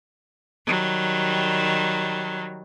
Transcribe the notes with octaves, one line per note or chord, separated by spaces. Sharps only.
D#3 F#3 G3